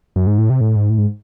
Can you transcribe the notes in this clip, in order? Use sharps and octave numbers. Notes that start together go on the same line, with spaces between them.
F#2
G#2
A2
C3
A2
G#2
A2
G#2